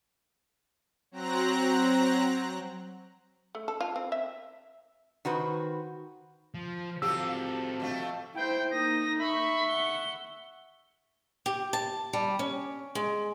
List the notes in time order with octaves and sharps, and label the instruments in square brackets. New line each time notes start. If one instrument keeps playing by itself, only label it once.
[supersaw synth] F#3 C4 A#5 F#6 A#6
[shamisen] A3
A4
F4
C4
E5
[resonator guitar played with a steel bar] D#3 F#4 B4 C5
[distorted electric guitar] F3
[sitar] F3 G4 [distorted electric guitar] C4 F#4 [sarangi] A4 [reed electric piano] E6
[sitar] F2 A3 C4
[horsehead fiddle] E4 C5 [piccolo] G5
[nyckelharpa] A#3 D#6 [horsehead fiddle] D#4 [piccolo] A#6
[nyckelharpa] E5 C#6 [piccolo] B5
[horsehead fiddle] F#5 [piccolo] G7
[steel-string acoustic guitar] G4
A5
G3
C#4
G#3